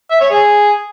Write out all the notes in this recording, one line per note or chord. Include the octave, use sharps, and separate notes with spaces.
E5
C#5
G#4